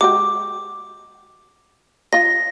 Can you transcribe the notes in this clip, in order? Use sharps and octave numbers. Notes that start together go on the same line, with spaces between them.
G#3 F#4 G4 D6
F4 D#5 A#6